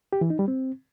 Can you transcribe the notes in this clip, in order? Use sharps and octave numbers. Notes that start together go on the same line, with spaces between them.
G4
E3
D#4
G3
C4